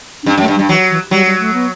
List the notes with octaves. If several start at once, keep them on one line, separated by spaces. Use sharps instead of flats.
D4
G2 C#4
F#2
A3
G2
G3
G2
E3 F#3
E3
F#3 G3
G3
A3
B3